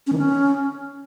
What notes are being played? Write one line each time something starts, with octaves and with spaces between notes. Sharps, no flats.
C#4
D#3
C#4